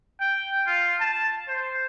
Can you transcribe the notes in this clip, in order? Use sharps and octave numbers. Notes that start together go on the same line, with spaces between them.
G5
F4
A5
C5